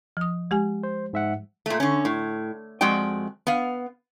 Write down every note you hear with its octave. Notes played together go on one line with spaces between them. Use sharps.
F3 D#6
G#3 G4 G#5
C5
G#2 E5 F#5
A#2 A3
D3 C#4
A2
F2 G#3 F#4 D5 G5
B3 F5